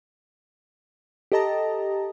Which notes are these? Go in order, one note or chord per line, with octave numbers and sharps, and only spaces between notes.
G4 A4 D#5 A5 A#5